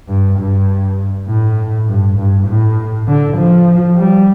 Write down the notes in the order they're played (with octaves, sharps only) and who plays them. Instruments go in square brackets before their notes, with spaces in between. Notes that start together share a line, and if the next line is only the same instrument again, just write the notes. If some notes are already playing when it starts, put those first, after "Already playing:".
[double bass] G2
G2
A2
G2
G2
A2
D3
F3
G3